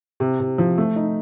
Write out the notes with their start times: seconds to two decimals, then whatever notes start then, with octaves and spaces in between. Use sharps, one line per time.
0.20 C3
0.40 C3
0.58 F3
0.78 A3
0.96 D#4